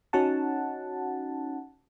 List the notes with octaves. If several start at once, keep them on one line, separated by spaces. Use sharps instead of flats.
C#4 D#4 F#4 F#5 A5